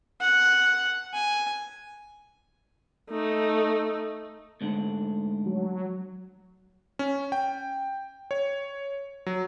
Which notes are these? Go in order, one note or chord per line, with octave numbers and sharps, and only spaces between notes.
F#5
G#5
A3 D#4
D2 G#2 D3
F#3
C#4
G5
C#5
F#3